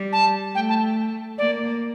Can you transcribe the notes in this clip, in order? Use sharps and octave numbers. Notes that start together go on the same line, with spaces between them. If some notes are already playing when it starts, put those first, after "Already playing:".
Already playing: G3
A5
A3 G5
A5
A#3 D5